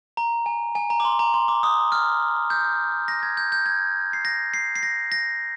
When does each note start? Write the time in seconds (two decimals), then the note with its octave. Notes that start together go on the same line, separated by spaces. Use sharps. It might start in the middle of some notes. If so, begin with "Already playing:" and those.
0.17 A#5
0.46 G#5
0.75 G#5
0.90 A#5
1.00 D6
1.05 C6
1.19 A#5
1.34 C6
1.48 D6
1.63 D#6
1.92 F6
2.50 G6
3.08 A#6
3.23 G#6
3.37 G6
3.52 G6
3.66 G#6
4.13 C7
4.25 A#6
4.54 C7
4.76 C7
4.83 A#6
5.12 A#6